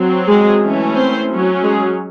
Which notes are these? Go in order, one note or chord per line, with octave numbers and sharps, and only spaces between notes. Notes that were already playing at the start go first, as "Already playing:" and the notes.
Already playing: F#3 C4
G#3 G#4
E3 A3 C#4
C4 C5
F#3 C#4
G#3 G#4